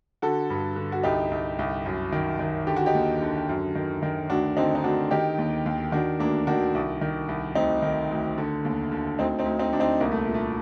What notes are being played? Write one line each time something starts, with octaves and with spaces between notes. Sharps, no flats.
D3 F#4 A4
G2
D3
F#4
C2 D#4 G4
C2
C2
F#2
D#3
D#3
D3 G4
F#4
D#4 G4
D#2
D3
F#2
D#3
D#3
D2 D4 F#4
D3 C4 D#4
D#4
D2 D4 F#4
D#3 D#4 G4
D#2
D#2
D#3 D4 F#4
D2 A#3 D4
D#3 D4 F#4
C2
D#3
C2
D2 C4 D#4
D#3
D2
D3
D#2
D3
D2 C4 D#4
C4 D#4
D2
C4 D#4
D2 D4
C4 D#4
C2 A#3
A3
A#2
A3